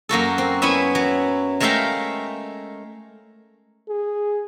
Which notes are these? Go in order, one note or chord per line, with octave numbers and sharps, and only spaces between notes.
F#2 A#3 F#4 A4
C4
B3 C#4 E4 E5
F#3
G#3 A3 A#4 E5 F5 G5
G#4